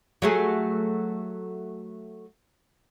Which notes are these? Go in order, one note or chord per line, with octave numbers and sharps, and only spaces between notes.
F#3 A3 G#4